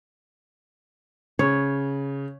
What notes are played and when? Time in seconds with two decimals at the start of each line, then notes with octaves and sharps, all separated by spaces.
1.39 C#3 C#5